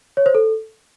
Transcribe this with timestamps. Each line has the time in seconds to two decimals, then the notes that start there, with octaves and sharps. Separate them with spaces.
0.17 C#5
0.26 C5
0.35 A4